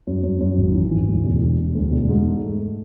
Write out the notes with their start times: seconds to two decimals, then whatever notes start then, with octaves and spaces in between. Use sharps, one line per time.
0.07 F#2
0.24 F#2
0.41 F#2
0.58 G#1
0.74 E3
0.91 E3
1.08 D2
1.25 E1
1.42 E1
1.58 E1
1.75 D2
1.92 E1
2.09 G#2
2.26 A3